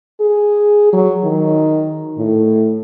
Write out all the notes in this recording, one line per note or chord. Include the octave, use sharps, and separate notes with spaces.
G#4
F#3
D#3
A2